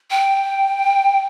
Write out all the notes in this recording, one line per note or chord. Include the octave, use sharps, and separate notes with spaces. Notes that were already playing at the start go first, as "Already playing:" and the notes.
G5